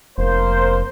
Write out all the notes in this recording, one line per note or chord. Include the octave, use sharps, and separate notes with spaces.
F1 A#3 C5